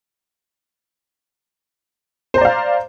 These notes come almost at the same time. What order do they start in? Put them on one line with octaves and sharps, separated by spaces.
C5 A#5 D5 F5